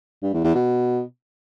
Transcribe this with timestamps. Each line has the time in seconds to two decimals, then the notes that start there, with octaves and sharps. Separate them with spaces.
0.23 G2
0.33 E2
0.44 E2
0.55 B2